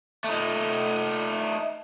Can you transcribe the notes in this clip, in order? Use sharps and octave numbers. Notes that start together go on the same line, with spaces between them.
A3 D#4